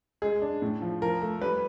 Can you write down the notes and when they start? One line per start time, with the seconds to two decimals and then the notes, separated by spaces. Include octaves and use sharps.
0.22 G#3 G#4
0.42 D4
0.62 A2
0.82 F3
1.02 F3 A#4
1.22 A3
1.41 G3 B4